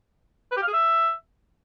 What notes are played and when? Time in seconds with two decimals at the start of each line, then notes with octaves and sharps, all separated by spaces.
0.51 B4
0.57 G4
0.62 F5
0.68 G#4
0.73 E5